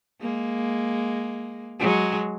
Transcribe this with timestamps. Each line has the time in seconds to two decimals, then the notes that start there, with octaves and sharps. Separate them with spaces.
0.21 G#3 A#3
1.80 F#3 G#3